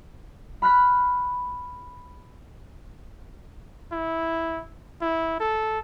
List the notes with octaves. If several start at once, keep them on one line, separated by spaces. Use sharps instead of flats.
B5 F6 F#6 B6
E4
E4
A4